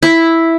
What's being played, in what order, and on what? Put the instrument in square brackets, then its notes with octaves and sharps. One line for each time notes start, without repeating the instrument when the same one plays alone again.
[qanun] E4